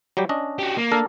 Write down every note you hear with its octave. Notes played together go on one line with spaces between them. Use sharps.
F#3 G3 G4
C#4 D4 D#5
F#4 G4
A#3
D4 A4 A#4